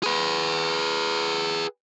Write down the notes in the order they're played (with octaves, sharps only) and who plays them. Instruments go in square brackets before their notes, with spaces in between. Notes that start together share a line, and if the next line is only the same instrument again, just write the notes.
[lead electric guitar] G#4 B4